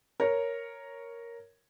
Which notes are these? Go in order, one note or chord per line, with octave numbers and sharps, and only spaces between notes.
A#4 C#5